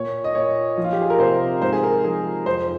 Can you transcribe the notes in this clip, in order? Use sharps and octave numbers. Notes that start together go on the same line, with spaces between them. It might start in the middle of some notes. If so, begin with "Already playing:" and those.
Already playing: A#2 C#5
D#5
A#2 C#5
F3
F4
G4
G#4
A#4
C3 C5
G#2 C5
G#4
A#4
F3 G#4
F2 C5